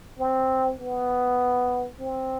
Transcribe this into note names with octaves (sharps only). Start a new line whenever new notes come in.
C4
B3
C4